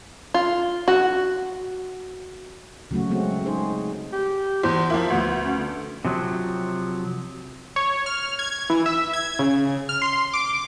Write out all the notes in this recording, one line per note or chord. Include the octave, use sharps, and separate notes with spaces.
F4
F#4
C#3 F#3 A3 F#4
G#3 A3 C4 C#4 F#4
G#3 D#4 G#4 C5
G4
E2 C5
F3 A#3 E4
D2 B3
C#4
D3
C3 F3 F#3
C#5
F6
G#6
E3
E5
G#6
C#3
F6
C6
D6